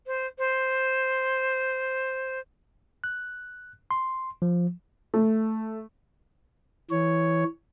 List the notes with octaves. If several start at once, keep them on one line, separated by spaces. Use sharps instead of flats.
C5
C5
F#6
C6
F3
A3
E3 C#5